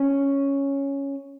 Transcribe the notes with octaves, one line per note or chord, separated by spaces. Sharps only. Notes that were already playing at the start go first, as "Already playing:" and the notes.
Already playing: C#4